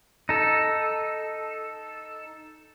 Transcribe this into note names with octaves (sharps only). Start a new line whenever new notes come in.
D#4 A4